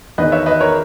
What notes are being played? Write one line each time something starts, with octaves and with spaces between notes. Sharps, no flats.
E2 D#3 B4 D#5
C#5 E5
B4 D#5
A#4 C#5